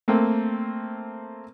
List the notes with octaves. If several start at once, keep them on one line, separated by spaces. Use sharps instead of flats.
A3 A#3 C4